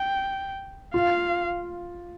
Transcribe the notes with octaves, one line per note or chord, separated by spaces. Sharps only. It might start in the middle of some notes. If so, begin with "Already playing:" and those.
Already playing: G5
F4 F5